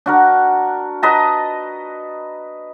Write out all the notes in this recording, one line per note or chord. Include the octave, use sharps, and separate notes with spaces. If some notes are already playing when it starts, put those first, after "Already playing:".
D4 F#4 A#4
B4 D#5 A5 A#5